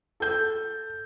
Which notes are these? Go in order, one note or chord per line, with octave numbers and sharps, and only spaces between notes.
A4 G6